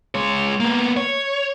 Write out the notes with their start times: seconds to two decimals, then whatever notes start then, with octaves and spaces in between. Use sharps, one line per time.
0.15 G#3 C#5
0.60 A#3 B3
0.97 C#5